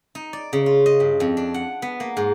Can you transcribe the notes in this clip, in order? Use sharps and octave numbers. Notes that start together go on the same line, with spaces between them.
D#4
D5
C#3
F4
D#5
G2
F2
D4
F#5
B3
A#3
G#2